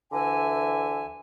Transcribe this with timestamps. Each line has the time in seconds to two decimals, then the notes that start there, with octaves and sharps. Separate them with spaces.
0.12 D2 D3 E3 E5 G#5